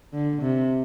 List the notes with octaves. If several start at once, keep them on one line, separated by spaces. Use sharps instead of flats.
D3
C3